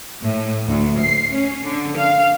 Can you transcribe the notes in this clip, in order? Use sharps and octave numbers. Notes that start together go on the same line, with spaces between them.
A2
D2
C7
C#4
D3
F5